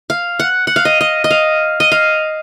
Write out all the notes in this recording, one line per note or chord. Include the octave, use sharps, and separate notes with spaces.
F5
F#5
F#5
F5
D#5
D#5
D#5
F5
D#5
F5